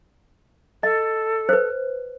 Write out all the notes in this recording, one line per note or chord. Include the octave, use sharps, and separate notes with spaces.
A4 D#5
B4 C5